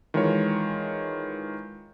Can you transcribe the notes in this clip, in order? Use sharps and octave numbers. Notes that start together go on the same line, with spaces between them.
D#3 E3 G#3 F4 A#4 C#5